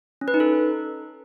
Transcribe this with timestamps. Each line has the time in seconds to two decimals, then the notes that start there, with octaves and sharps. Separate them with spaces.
0.21 C#4
0.28 B4
0.34 D#4
0.40 A4